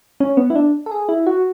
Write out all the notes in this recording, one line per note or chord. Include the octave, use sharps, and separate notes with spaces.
C#4
B3
E4
D4
A4
G#4
E4
F#4